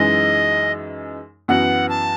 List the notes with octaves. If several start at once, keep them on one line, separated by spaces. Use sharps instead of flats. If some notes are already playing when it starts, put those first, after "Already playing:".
Already playing: F#2 E3 G#3 D#4 G#4 D#5
F#2 E3 B3 F#4 F#5
A5